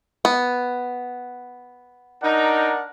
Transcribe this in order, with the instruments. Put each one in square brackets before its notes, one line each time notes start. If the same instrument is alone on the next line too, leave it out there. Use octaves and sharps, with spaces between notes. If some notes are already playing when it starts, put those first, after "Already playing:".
[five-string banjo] B3
[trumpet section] D4 A#4 F#5 [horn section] D#4